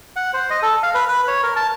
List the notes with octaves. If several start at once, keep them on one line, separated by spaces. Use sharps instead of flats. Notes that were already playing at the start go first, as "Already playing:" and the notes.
F#5
C5
D#5
A4
F5
B4
B4
C#5
A#4
A5